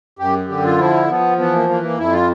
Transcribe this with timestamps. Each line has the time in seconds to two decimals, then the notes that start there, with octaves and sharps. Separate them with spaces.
0.19 F#2 G4
0.48 D3 G4
0.64 F4
0.78 F3 E4
1.08 F3 B3
1.38 E3 B3
1.53 A#3
1.69 E3 A#3
1.83 A#3
1.98 F2 E4
2.13 F4